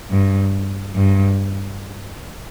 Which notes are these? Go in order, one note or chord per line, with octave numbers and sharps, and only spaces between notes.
G2
G2